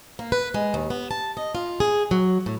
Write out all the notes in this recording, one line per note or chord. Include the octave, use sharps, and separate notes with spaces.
A#3
B4
G#3
D#2
B3
A5
D#5
F4
G#4
F#3
A2